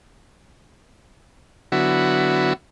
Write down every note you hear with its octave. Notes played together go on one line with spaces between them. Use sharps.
D3 F#3 B3 E4 F#4